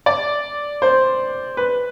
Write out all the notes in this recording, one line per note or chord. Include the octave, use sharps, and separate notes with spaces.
D5
C5
B4